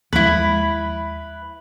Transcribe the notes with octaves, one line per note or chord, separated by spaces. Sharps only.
D#2 F3 G#3 E4 B4